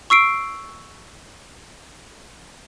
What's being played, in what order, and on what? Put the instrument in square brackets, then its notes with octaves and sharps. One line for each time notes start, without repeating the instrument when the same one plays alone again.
[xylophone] C#6 E6 C7 D7